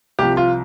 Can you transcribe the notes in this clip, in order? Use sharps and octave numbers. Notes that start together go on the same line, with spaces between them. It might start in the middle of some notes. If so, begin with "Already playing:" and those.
C2 C3 F3 G4
F4